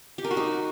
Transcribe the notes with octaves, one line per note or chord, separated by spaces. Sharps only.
G4
A#4
F#4
D#4